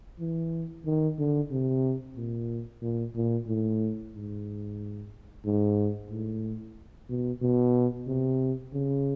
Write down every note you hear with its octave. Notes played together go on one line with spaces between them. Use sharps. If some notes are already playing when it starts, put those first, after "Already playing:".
E3
D#3
D3
C3
A#2
A#2
A#2
A2
G#2
G#2
A2
B2
B2
C3
C#3